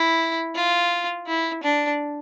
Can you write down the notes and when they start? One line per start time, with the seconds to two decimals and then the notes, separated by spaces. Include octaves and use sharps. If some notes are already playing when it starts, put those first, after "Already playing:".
Already playing: E4
0.56 F4
1.27 E4
1.64 D4